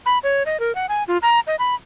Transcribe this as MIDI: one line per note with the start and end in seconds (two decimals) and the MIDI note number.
0.06 0.18 83
0.23 0.43 73
0.46 0.59 75
0.60 0.75 70
0.75 0.86 78
0.89 1.03 80
1.08 1.18 65
1.22 1.40 82
1.47 1.56 75
1.59 1.75 83